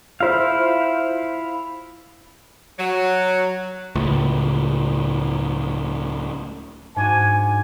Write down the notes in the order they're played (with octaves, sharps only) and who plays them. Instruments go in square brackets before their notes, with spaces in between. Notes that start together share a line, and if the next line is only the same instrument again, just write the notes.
[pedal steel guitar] E4 F5 [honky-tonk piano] F4 C5
[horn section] F#3
[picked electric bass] C#2 A2
[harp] G#2 D4 F#4 [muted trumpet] G#5